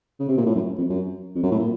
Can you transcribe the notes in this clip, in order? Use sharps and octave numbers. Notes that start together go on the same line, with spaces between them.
C#3
C3
A#2
A2
F#2
F2
F#2
F2
F#2
A2
A#2